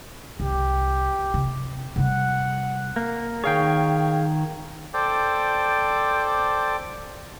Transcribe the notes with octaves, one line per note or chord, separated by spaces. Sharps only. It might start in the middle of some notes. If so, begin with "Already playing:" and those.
C2 G4
C3
C3 G3 F#5
A#3
D#3 G#4 C#5 F5 G5
A4 C5 D5 G5 D6